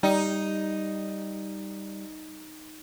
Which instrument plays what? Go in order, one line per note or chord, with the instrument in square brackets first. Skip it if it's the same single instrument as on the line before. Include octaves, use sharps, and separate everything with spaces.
[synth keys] G3 [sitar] D#4